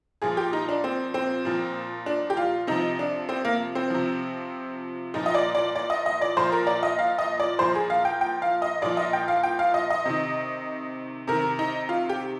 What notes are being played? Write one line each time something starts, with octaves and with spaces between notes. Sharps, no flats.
A#2 F3 G#4
G4
D#4
D4
C4
C4
A#2 F3
D4
G4
F4
C3 F3 D#4
D4
C4
A#3
C4
C3 F3
A#2 F3 D#4
D#5
D5
D5
D5
D#5
D#5
D5
A#2 F3 C5
A#4
D5
D#5
F5
D#5
D5
A#2 F3 C5
G#4
F5
G5
G5
F5
D#5
A#2 F3 D5
D#5
G5
F5
G5
F5
D#5
D#5
C3 D#3
C3 D#3 A#4
D#4
F4
G4